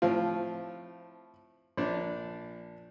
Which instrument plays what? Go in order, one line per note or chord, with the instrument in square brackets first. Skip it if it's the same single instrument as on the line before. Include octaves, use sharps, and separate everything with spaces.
[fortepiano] A2 F3 C4 F4
A#1 D4